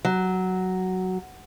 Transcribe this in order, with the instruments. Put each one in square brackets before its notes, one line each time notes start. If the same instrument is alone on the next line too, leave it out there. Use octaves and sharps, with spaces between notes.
[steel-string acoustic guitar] F#3